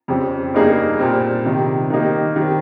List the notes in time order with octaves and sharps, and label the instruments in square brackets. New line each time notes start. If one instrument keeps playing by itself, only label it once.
[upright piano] F2 C#3 G3 C4 G4
G2 G3 A#3 D#4 G#4
A#2 G3 C4
C3 D#3 G3
D#3 G3 A#3 D#4 G4
D#3 G3 C4